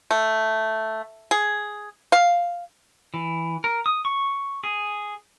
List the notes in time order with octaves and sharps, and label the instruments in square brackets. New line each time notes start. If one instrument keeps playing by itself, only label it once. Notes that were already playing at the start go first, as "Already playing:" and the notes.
[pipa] A3
G#4
F5
[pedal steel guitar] E3
A#4
D#6
C#6
G#4